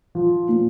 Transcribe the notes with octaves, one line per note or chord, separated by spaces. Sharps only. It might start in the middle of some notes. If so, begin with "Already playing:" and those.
F3
A#2